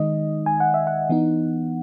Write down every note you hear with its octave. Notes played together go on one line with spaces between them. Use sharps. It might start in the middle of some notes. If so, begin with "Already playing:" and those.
Already playing: D#3 G#3 D#4 D#5
G#5
F#5
E5
F#5
E3 B3 D#4